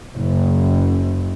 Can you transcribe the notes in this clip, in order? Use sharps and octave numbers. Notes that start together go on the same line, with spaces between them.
F#1